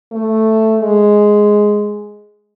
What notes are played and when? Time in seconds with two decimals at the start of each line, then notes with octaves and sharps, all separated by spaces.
0.12 A3
0.80 G#3